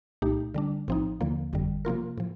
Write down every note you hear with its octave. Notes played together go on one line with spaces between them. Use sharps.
C2 A#2 A3 D#4 G4
D3 G3 D4
A#1 A2 F3 C4 D#4
D#2 D3 F3 A#3
G1 F2 D3 G3
C3 F3 A#3 F4 A#4
A2 F3